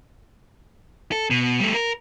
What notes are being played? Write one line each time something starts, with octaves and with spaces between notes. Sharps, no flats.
A4
B2
G3 A3
A#4